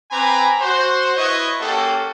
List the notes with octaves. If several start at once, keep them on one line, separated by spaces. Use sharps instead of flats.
C4 B4 G#5 A#5 B5 D6
F#4 C5
E4 B4 C#5 D#5
A#3 C#4 F#4 G4 A4